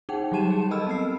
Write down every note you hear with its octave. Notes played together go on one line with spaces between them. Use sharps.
D#4 G#4 F#5 G5
F#3 G3 G4 A5 D#7 E7
G#4
A4 A#4 D#5 B5 E6 F6
B3 C4 E6 C7